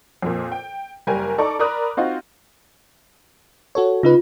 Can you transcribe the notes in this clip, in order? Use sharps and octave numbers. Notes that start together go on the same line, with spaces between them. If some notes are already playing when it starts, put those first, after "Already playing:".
F2 A#2
G5
F#1 G3 A#4 G#5
D#4 A4 D5 A#5 C#6 D6
A#4 D5 A#5 B5 D#6 F#6
C4 D#4 F4 F#4
F#4 A4 C#5
C#3 D#4 F4 B4